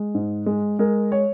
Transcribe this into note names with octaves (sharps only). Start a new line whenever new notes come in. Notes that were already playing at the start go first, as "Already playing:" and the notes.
Already playing: G#3
G#2
G#3
G#3 A#4
C#5